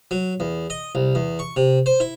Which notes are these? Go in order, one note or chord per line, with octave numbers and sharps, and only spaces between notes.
F#3
E2
D#5
C2
E2
C#6
C3
C5
E4